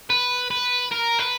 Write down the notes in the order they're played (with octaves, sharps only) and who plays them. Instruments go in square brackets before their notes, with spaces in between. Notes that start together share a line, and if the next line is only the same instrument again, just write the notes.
[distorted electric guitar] B4
B4
A#4
B4